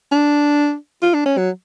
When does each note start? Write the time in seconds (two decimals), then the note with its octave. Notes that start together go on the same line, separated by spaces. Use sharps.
0.12 D4
1.02 F4
1.14 D4
1.26 C#4
1.37 F#3